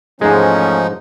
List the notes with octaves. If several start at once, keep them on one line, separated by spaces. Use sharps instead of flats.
E2 G#2 F3 G#3 A3 C#4 D#4